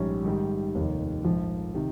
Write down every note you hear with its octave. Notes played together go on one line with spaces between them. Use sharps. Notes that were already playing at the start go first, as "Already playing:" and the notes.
Already playing: A#1 G#2 G3 C#4
G#2 D#3 G3
F1 D#2 D#3
A#1 G#2 F3
C3 D#3